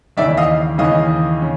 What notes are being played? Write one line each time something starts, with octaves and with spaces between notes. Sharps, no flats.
D#2 C#3 E3 D5 E5
D#5 F5
D#2 C#3 E3 D#5 F5
C#3